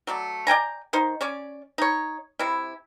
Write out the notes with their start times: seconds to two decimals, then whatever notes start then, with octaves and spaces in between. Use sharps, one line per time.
0.07 F#3 A3 D5
0.47 D5 G5 G#5 A#5
0.93 D#3 D#4 C5
1.21 C#4 C#5 D5
1.78 D#4 C#5
2.39 C3 E4